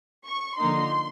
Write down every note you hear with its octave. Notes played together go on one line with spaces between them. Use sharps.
C#6
D3 F3 A#3 D#4 C6